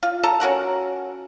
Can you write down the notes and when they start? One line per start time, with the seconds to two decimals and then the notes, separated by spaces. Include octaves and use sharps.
0.03 F4
0.23 A4 A5 A#5
0.40 C#4 F#4 A#4 F#5